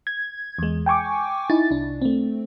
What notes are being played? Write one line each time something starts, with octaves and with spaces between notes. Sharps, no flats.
G#6
E2 G#3
G5 G#5 C#6 D6
D#4 E4 A6
C2 D4
A3 C4